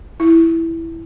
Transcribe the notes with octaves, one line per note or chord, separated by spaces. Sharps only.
E4